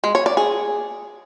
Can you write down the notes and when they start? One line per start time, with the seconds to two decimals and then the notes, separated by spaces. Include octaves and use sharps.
0.04 G#3
0.15 C#5
0.26 D5
0.37 G#4